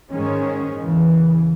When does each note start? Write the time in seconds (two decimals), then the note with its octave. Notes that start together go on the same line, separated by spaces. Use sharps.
0.12 G#2 D#3 G#3 C#4
0.79 E2 C#3 E3